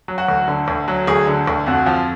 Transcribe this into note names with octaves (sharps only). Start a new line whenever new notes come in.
F#3
F#4
D2
D3
D2
F#3
D2 G#4
D3
D2
F2 F#4
F3